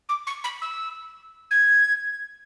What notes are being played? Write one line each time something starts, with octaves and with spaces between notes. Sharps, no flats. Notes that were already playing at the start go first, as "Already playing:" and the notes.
D6
C#6
B5
E6
G#6